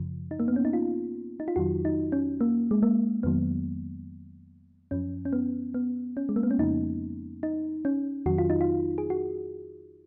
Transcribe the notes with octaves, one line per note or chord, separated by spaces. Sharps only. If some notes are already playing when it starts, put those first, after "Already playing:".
Already playing: F#2 C#3 F3
D#4
A#3
B3
C#4
D#4
F4
D#4
F4
F2 D#3 F#3 F#4
D#4
C#4
A#3
G#3
A#3
F2 D#3 F#3 B3
F#2 F3 C#4
C#4
B3
B3
C#4
G#3
A#3
B3
C#4
F2 C#3 F3 D#4
D#4
C#4
F2 D#3 F#3 F#4
F4
D#4
F4
G#4
F#4